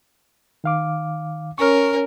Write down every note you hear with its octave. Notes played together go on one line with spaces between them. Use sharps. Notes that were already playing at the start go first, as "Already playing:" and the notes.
D#3 F5 D6
C#4 A#4 C#6 F6